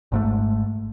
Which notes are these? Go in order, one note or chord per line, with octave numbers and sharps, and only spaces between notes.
G#1 G#2 A3